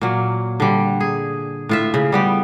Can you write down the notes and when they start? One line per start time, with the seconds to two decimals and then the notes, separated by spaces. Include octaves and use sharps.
0.01 A#2 F#3 A#3
0.60 D3 G3
1.00 G#4
1.69 A2 F4 E5
1.94 C#3
2.12 G3 B3 G4